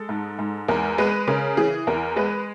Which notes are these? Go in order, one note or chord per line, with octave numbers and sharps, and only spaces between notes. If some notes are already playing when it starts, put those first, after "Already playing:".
Already playing: G#3 A4
G#2
G#2
E2 A#4
G#3 B4
C#3 A#4
E3 G#4
E2 A#4
G#3 B4